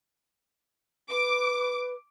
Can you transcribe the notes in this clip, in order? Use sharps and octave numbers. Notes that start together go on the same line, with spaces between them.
B4 D6